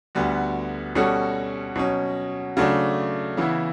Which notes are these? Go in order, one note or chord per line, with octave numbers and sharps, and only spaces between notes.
D2 D3 G3 B3 F#4
B2 G3 C#4 F#4 A4
B2 F#3 C#4
C#3 F#3 A3 D4
C#3 E3 B3 E4